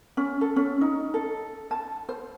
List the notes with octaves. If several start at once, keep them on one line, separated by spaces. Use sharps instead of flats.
C#4
A4
C#4
D#4
A4
A5
C5